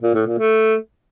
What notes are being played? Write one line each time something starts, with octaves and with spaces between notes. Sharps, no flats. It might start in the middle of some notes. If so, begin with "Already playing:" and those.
A#2
A2
A#2
A3